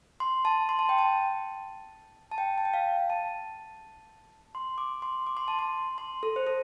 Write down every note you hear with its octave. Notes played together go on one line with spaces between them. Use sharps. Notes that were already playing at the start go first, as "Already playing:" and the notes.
C6
A5
C6
A5
G5
A5
A5
G5
A5
G5
F5
A5
C6
D6
C6
D6
C6
A5
C6
C6
A4
C5
A4